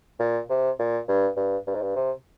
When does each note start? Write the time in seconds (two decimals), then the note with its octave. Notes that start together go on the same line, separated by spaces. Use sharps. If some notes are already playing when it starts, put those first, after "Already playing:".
0.20 A#2
0.50 C3
0.79 A#2
1.08 G2
1.37 G2
1.67 G2
1.75 G#2
1.82 G2
1.96 C3